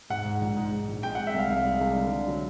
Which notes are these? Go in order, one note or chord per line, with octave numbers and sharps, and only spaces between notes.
G#2 F#5
G#2
A#1
G#2
G#2
A#1
G#3 G5
F#5
G#3
E5
C2 F5
C2 F5
G#3
C2
D3
D3
F#3